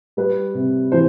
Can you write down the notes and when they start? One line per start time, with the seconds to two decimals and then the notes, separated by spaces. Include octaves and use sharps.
0.17 G3 B4
0.55 C3
0.92 E3 C5